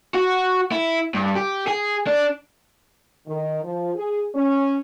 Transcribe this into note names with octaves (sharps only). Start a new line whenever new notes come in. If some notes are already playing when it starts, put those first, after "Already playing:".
F#4
E4
G2
G4
G#4
D4
D#3
F3
G#4
C#4